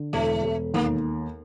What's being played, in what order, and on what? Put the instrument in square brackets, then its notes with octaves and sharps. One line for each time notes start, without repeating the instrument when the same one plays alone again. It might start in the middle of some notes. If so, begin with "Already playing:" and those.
Already playing: [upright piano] D3
[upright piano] E1 [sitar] A3
[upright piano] E1
[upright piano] D#2 [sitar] A#3